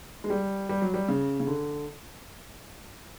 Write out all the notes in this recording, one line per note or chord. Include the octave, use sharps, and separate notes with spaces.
G#3
G3
G3
F#3
G3
C#3
C#3
D3